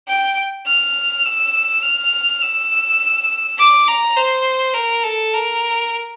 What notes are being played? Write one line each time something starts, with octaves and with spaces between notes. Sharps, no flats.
G5
F6
E6
F6
E6
D6
A#5
C5
A#4
A4
A#4